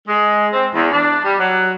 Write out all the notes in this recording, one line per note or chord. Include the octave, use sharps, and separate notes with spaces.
G#3
C4
E2
D4
G3
F#3